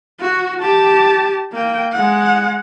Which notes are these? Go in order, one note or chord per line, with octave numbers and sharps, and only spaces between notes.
F#4
G4 A5
A#3 G5
G#3 F#5